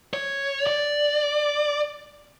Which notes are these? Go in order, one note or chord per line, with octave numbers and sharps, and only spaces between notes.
C#5
D5